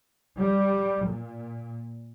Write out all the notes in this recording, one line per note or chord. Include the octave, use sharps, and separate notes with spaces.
G3
A#2